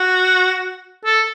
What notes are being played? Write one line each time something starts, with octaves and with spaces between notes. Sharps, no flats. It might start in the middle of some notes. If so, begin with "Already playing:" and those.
Already playing: F#4
A4